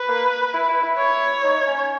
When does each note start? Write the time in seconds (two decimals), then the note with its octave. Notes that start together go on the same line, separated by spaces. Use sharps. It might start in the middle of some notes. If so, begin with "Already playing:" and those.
Already playing: B4
0.08 A#3
0.54 E4
0.69 E4
0.83 E4
0.98 C#5
1.44 D#4
1.67 C#4